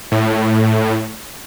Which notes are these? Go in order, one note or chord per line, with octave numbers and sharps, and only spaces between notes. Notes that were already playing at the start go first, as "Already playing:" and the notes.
A2